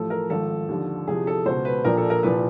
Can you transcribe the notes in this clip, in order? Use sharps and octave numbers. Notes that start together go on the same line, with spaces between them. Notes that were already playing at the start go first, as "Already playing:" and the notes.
Already playing: A1 A2 F3 A4
A#4
G#1 G#2 F3 A4
D#2 D3 F3
E2 C3 F3 G#4
A4
C#2 B2 C5
B4
A#1 A#2 F3 A#4
A4
A#4
C2 A#2 F3 B4